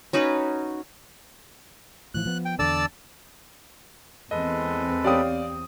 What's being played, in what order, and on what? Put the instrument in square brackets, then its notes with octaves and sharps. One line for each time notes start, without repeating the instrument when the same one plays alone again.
[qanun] C#4 D#4 F#4 B4
[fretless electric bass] A2 E3 F3 [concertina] F#6
[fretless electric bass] F3 B3
[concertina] G5
[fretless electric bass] E2 D3 [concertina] D5 A5 E6
[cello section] E2 C4 [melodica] G#3 A4 B4 [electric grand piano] D#5
[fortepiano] G4 C#5 G5 [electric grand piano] D5 F5 D#6